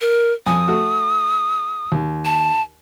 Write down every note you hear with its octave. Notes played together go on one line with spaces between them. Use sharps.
A#4
F2 G#5 D#6
A3 F#4
D#2
A5